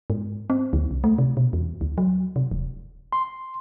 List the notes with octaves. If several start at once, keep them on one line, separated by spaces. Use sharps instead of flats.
G#2
C4
D2
C2
A3
C3
B2
E2
D2
F#3
C3
D#1
C6